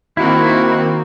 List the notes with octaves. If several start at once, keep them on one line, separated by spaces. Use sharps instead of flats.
D#3 A#3 C4 E4 F#4